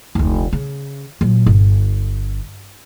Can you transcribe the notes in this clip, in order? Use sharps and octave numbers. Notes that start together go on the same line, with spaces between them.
F1 D2
C#3
A#2 F#3
G1